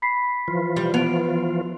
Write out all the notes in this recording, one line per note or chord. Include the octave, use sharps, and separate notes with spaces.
B5 B6 C7
E3 F3 F4
G3
B3 D7 F7